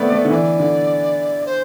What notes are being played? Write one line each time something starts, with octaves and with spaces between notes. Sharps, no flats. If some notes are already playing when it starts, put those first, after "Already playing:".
Already playing: A3 B3 C4 D5
A3
D3
E3 D5
D3
C5